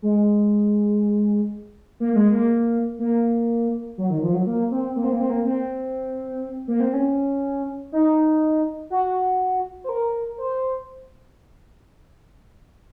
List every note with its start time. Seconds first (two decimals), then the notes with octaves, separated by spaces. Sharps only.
0.02 G#3
2.00 A#3
2.13 A#3
2.16 G#3
2.32 A#3
2.99 A#3
3.98 F#3
4.10 D#3
4.22 F3
4.34 F#3
4.46 A#3
4.71 C4
4.96 A#3
5.04 C4
5.13 A#3
5.20 C4
5.30 A#3
5.45 C4
6.68 A#3
6.80 C4
6.93 C#4
7.92 D#4
8.90 F#4
9.84 C5
9.89 A#4
10.38 C5